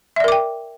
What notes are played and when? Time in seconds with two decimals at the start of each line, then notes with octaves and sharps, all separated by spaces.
0.16 E5
0.20 D5
0.24 A#4
0.28 D6
0.32 G5